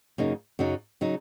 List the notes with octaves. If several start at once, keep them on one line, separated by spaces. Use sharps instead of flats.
F#2 C#3 A#3 D#4
F#2 C#3 F#3 D#4
C#3 F#3 D#4